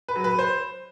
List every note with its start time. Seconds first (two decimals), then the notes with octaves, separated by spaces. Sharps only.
0.08 B4
0.16 F#3
0.24 B4
0.39 C5